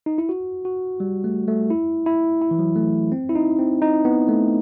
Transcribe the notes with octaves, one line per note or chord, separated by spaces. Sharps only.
D#4
E4
F#4
F#4
G3
A3
A3
E4
E4
E4
E3
F#3
A3
C4
E4
D#4
C4
D#4
B3
A3